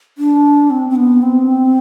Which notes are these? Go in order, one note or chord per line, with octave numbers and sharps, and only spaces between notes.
D4
C4
C4
B3
C4